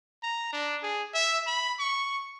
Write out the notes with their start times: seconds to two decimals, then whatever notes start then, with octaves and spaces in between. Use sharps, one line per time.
0.23 A#5
0.53 D4
0.83 G#4
1.14 E5
1.47 B5
1.79 C#6